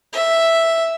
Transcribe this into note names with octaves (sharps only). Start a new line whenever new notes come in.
E5